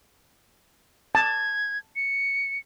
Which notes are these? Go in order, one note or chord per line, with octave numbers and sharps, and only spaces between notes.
A5 G#6
C#7